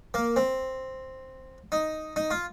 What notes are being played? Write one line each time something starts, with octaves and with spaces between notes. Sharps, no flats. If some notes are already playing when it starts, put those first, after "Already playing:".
A#3
C4
D#4
D#4
F4